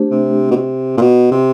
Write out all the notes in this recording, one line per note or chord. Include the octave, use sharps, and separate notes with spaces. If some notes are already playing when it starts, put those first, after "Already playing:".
Already playing: A3 D4 G4 C5
C3
B2
C3
A#2
B2
C3